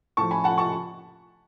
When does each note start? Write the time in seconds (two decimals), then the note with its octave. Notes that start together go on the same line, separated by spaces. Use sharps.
0.17 A2 F3 A5 C#6
0.31 G#5 B5
0.44 F#5 A5
0.58 A5 C#6